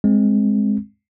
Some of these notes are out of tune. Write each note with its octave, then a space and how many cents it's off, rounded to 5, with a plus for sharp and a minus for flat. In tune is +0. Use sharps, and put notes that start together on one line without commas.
G#3 +0 C4 +5